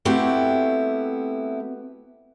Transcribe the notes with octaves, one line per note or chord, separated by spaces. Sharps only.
A3 B3 C4 E4 F#4 G4